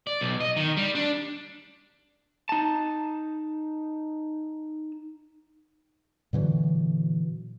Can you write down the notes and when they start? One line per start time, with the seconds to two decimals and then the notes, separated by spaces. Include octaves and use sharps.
0.07 D5
0.21 B1
0.40 D#5
0.56 D#3
0.77 G3
0.95 D4
2.49 D#4 A5
6.33 A#2 D3 E3 F#3